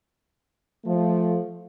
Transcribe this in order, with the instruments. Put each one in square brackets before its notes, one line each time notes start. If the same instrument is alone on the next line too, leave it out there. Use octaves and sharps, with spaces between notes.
[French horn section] F3 A3